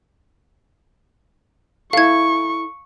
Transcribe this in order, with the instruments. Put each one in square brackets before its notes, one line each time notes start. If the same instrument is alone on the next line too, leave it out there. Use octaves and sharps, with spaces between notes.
[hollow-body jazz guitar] E4 A4 [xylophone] F5 G#6 [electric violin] C#6